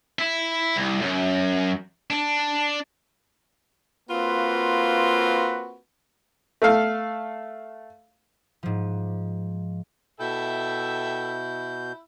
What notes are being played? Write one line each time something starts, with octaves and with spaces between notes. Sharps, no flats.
E4
C2
F#2
D4
A#3 C4 F4 F#4 B4
A3 A4 F5
G#2 F3
B2 E4 A4 E5 G5 G6